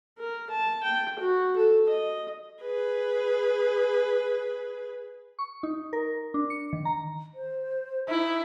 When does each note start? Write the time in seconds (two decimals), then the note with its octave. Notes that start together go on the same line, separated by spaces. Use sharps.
0.19 A#4
0.50 A5
0.83 G5
1.19 F#4
1.56 A4
1.89 D#5
2.62 G#4 B4
5.39 C#6
5.63 D#4
5.93 A#4
6.34 D4
6.50 C#7
6.73 D#3
6.85 A#5
7.34 C5
8.09 D#4 E4